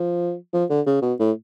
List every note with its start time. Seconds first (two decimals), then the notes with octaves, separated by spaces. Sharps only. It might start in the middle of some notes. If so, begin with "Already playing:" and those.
Already playing: F3
0.53 F3
0.70 D3
0.86 C#3
1.02 B2
1.20 A2